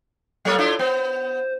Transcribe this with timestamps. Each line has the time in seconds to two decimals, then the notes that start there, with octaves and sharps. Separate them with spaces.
0.45 F#3 A#3 A4 C#5
0.58 D4 E4 F4
0.79 B3 C5